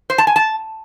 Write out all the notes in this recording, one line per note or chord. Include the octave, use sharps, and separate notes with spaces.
C5
A5
G#5
A5